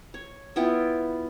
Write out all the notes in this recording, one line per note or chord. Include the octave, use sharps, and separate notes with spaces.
C#5
B3 E4 F4 G5